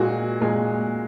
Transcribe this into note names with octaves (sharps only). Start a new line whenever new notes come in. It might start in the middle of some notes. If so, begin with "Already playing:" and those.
Already playing: A#2 G#3 F#4
A#2 G#3